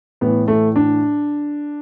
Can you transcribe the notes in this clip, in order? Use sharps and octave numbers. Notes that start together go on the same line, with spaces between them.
A2 E3 B3
A3
D4